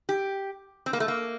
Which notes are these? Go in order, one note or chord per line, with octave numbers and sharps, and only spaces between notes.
G4
C4
A#3
A3
A#3